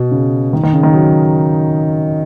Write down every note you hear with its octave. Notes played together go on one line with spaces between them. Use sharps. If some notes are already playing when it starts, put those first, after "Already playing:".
Already playing: B2
C#3
D#3
D#3
C#3
D#3
F#3